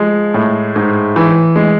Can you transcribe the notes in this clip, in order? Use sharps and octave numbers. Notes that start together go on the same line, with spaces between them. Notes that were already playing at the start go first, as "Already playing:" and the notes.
Already playing: F3 G#3
A2
G#2
E3
G#3